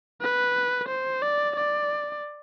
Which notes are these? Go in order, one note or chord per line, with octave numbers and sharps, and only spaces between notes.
B4
C5
D5
D5